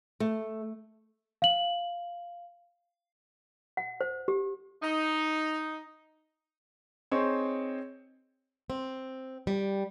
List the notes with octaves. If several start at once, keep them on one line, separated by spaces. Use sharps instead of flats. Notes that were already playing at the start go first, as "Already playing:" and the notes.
A3
F5 F#7
F#5
C5
G4
D#4
C4 D#4 G#4 C5 C#5
C4
G3